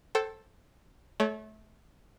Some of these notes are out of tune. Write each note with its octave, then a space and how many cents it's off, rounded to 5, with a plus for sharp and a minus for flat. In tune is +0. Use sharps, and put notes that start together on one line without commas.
A4 +0 C5 +30 G5 -35
A3 -25 C#5 +15